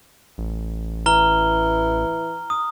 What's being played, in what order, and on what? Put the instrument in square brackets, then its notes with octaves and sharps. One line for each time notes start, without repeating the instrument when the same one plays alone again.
[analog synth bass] A1
[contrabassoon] E3 [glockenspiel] A#5 F6 G7
[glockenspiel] D#6